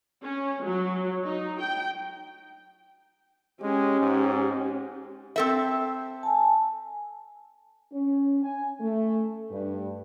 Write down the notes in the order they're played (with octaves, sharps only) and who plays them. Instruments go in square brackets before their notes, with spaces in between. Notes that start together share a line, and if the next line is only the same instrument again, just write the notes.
[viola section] C#4
F#3
D#4
G5
[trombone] G#3 [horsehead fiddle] C#4 G4
[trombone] G#2
[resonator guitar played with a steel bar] C4 A4 E5
[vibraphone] G#5 A5
[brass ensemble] C#4
G#5
A3
G2